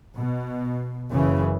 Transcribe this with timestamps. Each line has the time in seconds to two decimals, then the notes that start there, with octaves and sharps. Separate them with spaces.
0.17 B2
1.10 F#1 C#3 E3